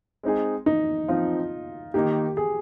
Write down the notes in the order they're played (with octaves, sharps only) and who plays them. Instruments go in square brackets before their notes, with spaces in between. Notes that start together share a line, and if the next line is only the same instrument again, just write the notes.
[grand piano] G#3 C4 D#4 G#4
[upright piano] D#4
[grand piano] F3 C4 D#4 [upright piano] F4
[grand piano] D#3 A#3 D#4 [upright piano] G4
[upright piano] G#4